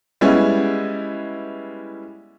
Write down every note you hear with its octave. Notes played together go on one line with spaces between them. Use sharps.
G3 G#3 B3 C#4 E4